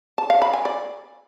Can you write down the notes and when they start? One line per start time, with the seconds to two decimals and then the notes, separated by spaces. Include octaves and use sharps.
0.18 A5
0.30 F5
0.42 B5
0.53 G#5
0.65 D5